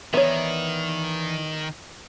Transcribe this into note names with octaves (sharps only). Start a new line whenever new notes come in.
D#3 E3 B3 C#5 D5 E5